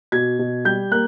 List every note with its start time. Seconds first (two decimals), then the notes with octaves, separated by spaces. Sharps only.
0.12 B2 G#6
0.39 B2
0.65 G3 G6
0.91 A#3 F#6